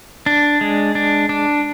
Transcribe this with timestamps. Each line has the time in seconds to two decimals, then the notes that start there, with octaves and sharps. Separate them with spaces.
0.26 D4
0.61 G#3
0.95 D4
1.29 D4